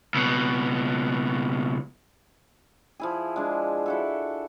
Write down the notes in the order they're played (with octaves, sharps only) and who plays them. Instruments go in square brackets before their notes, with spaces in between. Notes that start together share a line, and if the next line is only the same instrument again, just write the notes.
[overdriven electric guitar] C#2 B2
[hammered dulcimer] F3 E4 G#4
G#3 D4
E4 F#4 A4